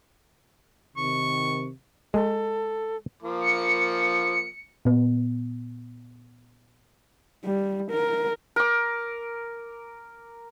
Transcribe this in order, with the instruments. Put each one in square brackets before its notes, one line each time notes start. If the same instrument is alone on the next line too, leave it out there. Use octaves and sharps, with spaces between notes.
[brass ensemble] C3 D#3 [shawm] C#6
[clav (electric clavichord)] G#3 [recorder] A4
[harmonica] F3 A#3
[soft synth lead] C#7
[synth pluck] A#2 B3
[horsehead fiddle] G3
A#4
[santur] A#4 D6